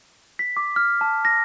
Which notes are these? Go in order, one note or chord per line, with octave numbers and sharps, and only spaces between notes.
B6
D6
F6
A5
A#6